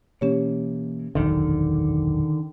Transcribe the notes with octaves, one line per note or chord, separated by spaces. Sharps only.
B2 E3 A#3 C#4 G4 C#5
E1 A#1 F#2 D3 D#3